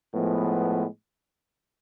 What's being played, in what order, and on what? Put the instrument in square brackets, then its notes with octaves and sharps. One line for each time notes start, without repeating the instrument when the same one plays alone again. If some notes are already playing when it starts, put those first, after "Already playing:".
[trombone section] A2 F3 G#3 B3